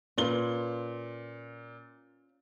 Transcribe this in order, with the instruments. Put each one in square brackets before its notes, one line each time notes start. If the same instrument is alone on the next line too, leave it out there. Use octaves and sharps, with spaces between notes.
[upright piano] A#2 G7 [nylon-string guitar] C#4 F4 B4